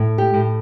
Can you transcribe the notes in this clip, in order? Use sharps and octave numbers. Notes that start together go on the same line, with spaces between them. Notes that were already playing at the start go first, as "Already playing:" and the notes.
Already playing: A2
G4
A2